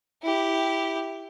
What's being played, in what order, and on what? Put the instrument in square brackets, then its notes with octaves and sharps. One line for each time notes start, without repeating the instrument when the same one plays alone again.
[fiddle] E4 G4